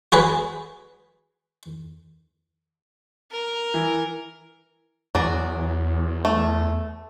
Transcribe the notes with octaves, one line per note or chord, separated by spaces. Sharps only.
F#4 G#4 B4
A#4
E3
E2 F#3 G#4 D5
A3